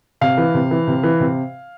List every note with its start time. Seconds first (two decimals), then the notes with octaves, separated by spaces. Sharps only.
0.21 C3 F5
0.38 E3
0.54 C3
0.71 E3
0.87 C3
1.03 E3
1.20 C3